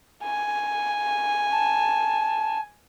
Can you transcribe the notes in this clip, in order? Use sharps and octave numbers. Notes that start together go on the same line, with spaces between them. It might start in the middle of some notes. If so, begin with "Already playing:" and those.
G#5
A5